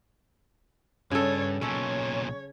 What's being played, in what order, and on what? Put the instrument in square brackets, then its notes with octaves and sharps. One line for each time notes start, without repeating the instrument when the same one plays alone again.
[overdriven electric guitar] G2 [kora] C#3 A4 [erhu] C#5
[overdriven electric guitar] B1 A#2 [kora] C#4 A4 [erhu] C#5